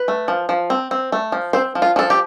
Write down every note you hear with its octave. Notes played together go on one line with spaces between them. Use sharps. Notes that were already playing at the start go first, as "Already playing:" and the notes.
Already playing: B4
A3
F3
F3
C4
C4
A3
F3
C4 C5
F3
F4
F3 A4
G4